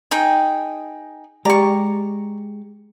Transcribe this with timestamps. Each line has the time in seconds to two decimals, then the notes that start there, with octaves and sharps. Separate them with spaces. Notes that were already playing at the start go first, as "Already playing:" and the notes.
0.11 D#4 G#4 G5
1.45 G#3 G4 D5 A#5 C#6